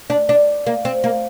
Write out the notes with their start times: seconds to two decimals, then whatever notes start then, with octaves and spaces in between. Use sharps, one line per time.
0.10 D4
0.29 D4
0.66 A#3
0.85 C4
1.04 A#3